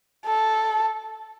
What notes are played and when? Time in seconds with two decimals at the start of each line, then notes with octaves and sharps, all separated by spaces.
0.27 A4